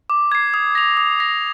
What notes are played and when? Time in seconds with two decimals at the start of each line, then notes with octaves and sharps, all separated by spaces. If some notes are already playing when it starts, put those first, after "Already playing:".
0.10 D6
0.32 G#6 C7
0.54 D#6
0.75 A#6 F7
0.97 D#6
1.20 A#6 F7